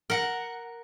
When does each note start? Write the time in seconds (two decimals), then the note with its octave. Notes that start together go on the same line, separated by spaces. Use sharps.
0.10 A#4 F#5